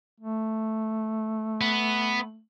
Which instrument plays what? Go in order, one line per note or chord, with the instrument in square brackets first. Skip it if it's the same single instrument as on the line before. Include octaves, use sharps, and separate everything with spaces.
[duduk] A3
[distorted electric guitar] B3